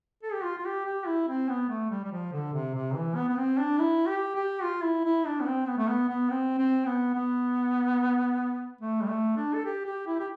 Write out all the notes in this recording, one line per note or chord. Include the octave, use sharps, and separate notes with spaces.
A4
G4
F4
F4
G4
G4
E4
C4
B3
A3
G3
G3
F3
D3
C3
C3
E3
B3
B3
C4
D4
E4
G4
G4
F4
E4
E4
D4
B3
C4
B3
A3
B3
B3
C4
C4
B3
B3
A3
G3
A3
D4
A4
G4
G4
E4
G4